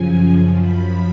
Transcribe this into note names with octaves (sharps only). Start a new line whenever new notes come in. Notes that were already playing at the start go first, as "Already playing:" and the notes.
Already playing: F#2 C#3 F3 G#5
F#2 F3
B5